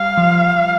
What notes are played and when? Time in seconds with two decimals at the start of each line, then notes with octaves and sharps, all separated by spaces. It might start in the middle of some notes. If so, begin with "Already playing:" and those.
Already playing: G3 F5
0.18 F3